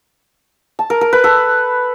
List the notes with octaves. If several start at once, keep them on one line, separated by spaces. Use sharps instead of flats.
A5
A#4
A#4
B4
A4